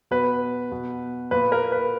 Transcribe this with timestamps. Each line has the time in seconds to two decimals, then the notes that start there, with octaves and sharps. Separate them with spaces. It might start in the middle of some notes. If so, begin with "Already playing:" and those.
0.11 B2 B4
0.72 B2
1.31 A#2 B4
1.52 A#4
1.72 B4